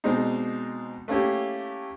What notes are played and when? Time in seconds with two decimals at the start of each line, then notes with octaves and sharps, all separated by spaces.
0.04 B2 G#3 C4 D4 D#4
1.08 A3 A#3 C#4 E4 G4